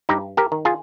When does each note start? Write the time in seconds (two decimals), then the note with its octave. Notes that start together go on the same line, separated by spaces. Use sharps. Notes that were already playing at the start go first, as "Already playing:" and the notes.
0.09 G2 D#4 G4
0.37 G4 A#4
0.52 D#3
0.65 F4 G#4